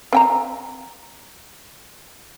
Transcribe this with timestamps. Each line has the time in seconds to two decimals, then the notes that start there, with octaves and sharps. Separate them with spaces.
0.13 C4 G5 A#5